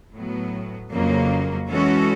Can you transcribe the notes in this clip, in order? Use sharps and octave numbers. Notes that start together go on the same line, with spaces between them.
A2 F#3 B3
F2 C#3 F#3 A#3
E3 G#3 C#4 F#4 A4